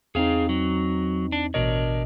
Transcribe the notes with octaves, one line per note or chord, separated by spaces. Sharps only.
E2 C4 D#4 G#4 F5
F#3
D4
A1 B2 D4 A#4 C#5 D#5